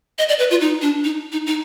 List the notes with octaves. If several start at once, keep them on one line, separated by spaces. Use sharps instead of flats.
D#5
D5
B4
F4
D#4
D4
D#4
D#4
D#4